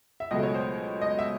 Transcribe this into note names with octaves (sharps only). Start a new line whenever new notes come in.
E5
C#2 B2 F#3 A3 D#5
C#5
C5
D#5
E5